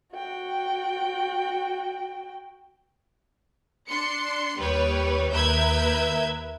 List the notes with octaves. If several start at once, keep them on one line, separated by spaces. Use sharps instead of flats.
F#4 G5
D4 C6 C#7
D#2 G3 G4 B4 C#5
D#2 A#4 B4 E5 G6 G#6